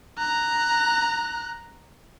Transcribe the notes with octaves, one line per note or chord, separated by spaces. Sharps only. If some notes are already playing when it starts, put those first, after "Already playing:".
A#5 F#6